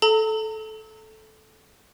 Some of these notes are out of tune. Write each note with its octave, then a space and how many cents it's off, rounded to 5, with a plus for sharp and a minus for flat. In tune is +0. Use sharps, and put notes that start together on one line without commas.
A4 -15 A#5 -40